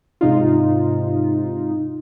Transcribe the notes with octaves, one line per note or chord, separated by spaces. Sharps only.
G#2 C3 D#4 F4